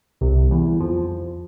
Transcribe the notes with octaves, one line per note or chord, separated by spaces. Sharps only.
C2 C3
E2 E3
F2 F3